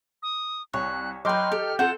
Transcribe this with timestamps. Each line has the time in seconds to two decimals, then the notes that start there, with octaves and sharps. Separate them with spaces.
0.23 D#6
0.73 C2 C#5 F#6
1.25 F#3 B4 D#5 G5 C6 D6 F6 G6
1.52 G4 A4
1.79 C4 F4 A4 F#5 G6 E7